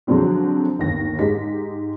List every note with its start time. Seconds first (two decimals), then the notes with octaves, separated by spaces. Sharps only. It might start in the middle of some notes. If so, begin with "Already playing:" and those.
0.07 D3 F3 F#3 G#3 C4 D4
0.79 G1 D#2 A#6
1.19 G#2 G#3 D#4 G4 B6